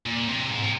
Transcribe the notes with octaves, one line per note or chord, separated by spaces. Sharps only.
A#2
C3
G#2
C3